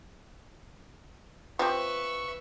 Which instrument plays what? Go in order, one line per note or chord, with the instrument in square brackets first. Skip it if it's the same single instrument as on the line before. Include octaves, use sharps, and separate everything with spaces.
[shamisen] F3 C4 G4 [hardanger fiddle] B4 E5 [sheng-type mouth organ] C#6